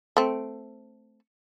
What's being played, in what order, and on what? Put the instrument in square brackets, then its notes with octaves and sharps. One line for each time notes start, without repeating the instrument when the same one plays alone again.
[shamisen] A3 C4